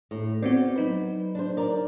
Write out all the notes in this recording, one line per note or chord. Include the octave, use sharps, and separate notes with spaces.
A2
B3 C4 F#4 D5
F#3 D#4 B4
D4 C5
A#4 D5